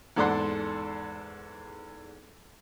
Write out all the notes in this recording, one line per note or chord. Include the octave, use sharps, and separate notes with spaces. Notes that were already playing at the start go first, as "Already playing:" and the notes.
E2 G#2 A4 D5 F#5 C6